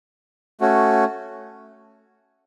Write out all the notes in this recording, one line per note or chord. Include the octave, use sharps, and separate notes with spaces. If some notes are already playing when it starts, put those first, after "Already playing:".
A3 C#4 F#4